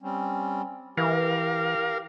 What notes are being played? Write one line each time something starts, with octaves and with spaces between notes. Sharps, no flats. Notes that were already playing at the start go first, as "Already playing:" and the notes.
G3 C4 C#4
E3 G4 A#4 F5